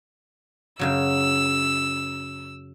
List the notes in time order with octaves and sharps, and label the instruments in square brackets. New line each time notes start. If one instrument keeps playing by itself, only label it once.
[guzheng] F#2 C#3 F#3 [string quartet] E6